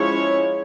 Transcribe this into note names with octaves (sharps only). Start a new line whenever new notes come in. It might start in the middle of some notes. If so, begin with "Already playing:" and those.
Already playing: F3 G#3 C#4 E4 C#5